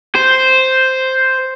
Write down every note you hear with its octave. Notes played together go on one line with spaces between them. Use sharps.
C5